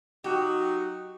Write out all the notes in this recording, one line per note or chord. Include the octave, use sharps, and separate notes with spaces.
F#3 D#4 F#4 G4